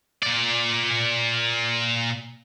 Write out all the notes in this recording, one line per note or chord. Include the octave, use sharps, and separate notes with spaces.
A#2 D5